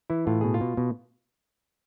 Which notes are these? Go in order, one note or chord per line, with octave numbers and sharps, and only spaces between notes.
E3 E4
A2 F4
B2 G#4
F4
B2
B2